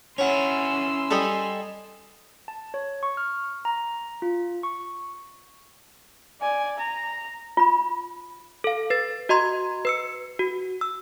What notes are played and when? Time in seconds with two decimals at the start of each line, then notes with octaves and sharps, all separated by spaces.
0.18 C#4 E4 C#5 F#5 C6 E6
1.11 G3 A4 D#5 G#5
2.48 A5
2.74 C#5
3.03 C#6
3.17 F6
3.65 A#5
4.22 F4
4.63 C#6
6.41 D5 G#5
6.78 A#5
7.57 F4 B5
8.64 A4 F5
8.90 B4 A6
9.29 F#4 D#5 A#5 C6 G#6
9.85 B4 E6 C#7
10.39 F#4
10.81 E6